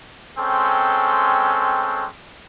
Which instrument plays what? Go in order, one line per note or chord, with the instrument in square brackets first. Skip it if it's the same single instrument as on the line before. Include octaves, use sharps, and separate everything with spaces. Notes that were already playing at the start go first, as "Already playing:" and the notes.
[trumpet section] G#3 C4 C#4 A4 G5